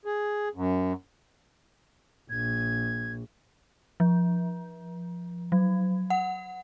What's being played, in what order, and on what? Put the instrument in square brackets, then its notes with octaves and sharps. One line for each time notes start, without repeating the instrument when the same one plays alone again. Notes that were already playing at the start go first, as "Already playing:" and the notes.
[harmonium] G#4
F#2
[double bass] A#1 [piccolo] G#6
[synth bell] F3
F#3
F#5